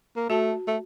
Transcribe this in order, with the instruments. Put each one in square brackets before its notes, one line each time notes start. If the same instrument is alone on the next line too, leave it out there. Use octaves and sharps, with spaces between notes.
[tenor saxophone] A#3
[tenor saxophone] A3 [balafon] F#4 A5
[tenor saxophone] A3